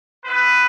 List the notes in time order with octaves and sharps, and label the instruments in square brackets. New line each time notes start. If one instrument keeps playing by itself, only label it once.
[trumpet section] B3 E4 B4